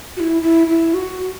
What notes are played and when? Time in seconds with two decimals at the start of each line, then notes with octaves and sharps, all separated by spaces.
0.17 F#4
0.20 E4
0.42 E4
0.68 E4
0.94 F#4